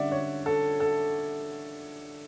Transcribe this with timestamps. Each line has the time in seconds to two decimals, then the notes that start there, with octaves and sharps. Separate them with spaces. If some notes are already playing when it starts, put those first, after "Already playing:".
Already playing: D3 G3 C#4 D5 E5 F#5
0.12 C#5
0.46 A4
0.80 A4